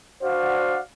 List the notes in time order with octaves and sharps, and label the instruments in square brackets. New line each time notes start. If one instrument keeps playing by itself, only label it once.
[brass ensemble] D4 F#4 C5 D5 F5 F#5